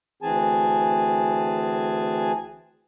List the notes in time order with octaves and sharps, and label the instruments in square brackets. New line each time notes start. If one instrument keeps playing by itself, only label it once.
[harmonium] D2 E3 C4 G#4 G#5 A5